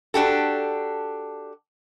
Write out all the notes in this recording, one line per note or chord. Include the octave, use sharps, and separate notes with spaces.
D4 F#4 G4 A4